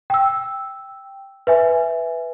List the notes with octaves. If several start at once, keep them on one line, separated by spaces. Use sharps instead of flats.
G5 E6
B4 E5 G#5